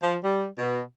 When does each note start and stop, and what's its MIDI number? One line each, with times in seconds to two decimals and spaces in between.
0.02 0.15 53
0.23 0.44 55
0.58 0.81 47